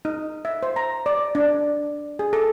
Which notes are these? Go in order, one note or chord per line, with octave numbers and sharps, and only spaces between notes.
D#4
E5
C5
A#5
D5
D4
G#4
A4